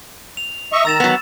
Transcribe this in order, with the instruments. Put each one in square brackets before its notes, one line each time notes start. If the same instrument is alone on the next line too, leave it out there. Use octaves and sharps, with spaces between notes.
[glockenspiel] F7
[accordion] D#5 E5 C#6
[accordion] D#3 A#5 [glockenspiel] E6 A6 E7
[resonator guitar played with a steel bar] F#3 B3